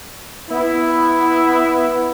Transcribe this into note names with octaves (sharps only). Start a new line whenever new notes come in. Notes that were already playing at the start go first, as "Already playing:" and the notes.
B3 E4